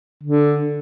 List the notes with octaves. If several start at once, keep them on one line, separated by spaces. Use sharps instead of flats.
D3